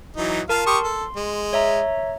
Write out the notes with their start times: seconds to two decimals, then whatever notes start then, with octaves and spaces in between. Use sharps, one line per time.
0.17 E3 F#3 D#4
0.49 F4 A#4 F5 A5
0.67 G4 C6 C#6 D#6
0.84 A4
1.16 G#3
1.53 C#5 E5 A#5